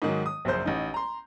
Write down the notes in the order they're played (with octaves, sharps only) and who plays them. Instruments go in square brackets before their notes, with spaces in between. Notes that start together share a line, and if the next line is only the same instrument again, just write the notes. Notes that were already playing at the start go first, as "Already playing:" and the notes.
[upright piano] G#2 D#3 F#3
D#6
A#1 F#2 C#3 C5 G6
A1 D#4
A#5 C6